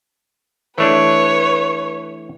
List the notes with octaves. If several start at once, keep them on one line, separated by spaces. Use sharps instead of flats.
E3 A3 D4 B4 C#5